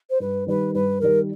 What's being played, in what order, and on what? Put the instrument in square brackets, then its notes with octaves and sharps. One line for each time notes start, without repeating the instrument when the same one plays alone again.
[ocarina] C5
[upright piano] G2 [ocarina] B4
[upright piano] D#3 G3 [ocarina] B4
[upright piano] G2 [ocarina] B4
[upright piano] D#3 G3 [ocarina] A#4